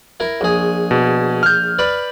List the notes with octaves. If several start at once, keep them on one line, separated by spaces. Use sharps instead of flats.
E4 A#4
A#1 G#4
B2
F6 G6
B4 D5 B5